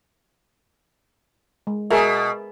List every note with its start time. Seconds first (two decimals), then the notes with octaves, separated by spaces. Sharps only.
1.67 G#3
1.90 B2 G#4 A#4 E5